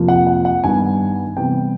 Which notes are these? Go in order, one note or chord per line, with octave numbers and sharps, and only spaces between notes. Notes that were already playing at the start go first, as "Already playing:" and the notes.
Already playing: F2 C3 F3 A#3
F#5
F#5
F#5
G2 D#3 G3 B3 G#5
C3 E3 G3 B3 G5